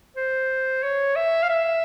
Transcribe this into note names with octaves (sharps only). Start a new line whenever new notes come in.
C5
C#5
E5
F5
E5